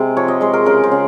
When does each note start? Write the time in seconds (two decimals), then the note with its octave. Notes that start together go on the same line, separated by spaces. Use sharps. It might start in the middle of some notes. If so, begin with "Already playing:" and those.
Already playing: C3 G#3
0.17 F3 C#5
0.28 D#5
0.41 G#3 C5
0.53 A#4
0.66 C#3 A#4
0.83 C5
0.91 C#3